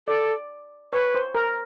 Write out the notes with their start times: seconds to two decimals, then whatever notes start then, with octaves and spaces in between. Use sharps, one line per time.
0.07 A4 D5
0.93 B4 C#5
1.14 C5
1.35 A#4